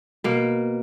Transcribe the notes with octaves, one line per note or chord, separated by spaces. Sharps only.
B2 A#3